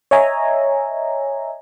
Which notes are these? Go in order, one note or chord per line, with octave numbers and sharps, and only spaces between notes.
C#5 D#5 E5 G#5 A#5